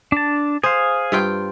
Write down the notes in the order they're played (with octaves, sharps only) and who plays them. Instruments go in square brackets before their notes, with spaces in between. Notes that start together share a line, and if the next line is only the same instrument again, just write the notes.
[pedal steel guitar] D4 A5
[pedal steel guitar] G#4 F5 [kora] C5
[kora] G2 F4 G5